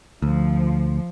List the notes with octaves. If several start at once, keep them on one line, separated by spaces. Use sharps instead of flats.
D2 F3